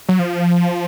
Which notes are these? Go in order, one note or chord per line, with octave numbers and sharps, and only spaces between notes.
F#3
F3